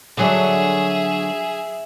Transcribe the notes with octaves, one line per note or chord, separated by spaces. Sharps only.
D3 F#3 D4 G#4 E5